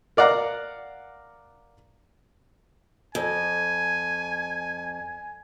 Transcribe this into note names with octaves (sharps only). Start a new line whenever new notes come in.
A#4 D5 F5 F#5 A#5
F2 G#5